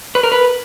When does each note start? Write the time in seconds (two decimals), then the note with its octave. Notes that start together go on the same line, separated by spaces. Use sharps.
0.15 B4
0.23 A#4
0.32 B4